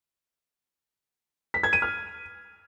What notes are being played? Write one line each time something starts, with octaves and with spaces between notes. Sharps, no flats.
B6
G#6
D#7
F6